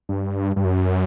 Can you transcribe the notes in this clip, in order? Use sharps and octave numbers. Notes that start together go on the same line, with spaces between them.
G2
G2
F#2